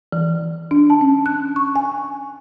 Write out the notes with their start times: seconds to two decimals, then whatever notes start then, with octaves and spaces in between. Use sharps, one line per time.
0.12 E3
0.71 D4
0.90 A5
1.01 C#4
1.26 F#6
1.56 C#6
1.76 G#5